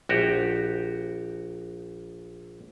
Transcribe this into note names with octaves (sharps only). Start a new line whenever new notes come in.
A#1 F#4 G4